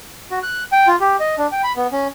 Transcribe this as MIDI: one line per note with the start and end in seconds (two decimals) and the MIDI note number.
0.31 0.39 66
0.43 0.63 90
0.72 0.87 79
0.87 0.96 65
1.01 1.16 67
1.20 1.35 75
1.38 1.47 62
1.52 1.62 79
1.63 1.72 83
1.76 1.87 59
1.92 2.08 61